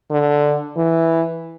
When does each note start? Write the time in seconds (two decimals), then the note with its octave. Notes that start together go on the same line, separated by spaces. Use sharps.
0.11 D3
0.77 E3